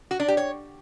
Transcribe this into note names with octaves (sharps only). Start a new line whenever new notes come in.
F#4
D4
G4
C#5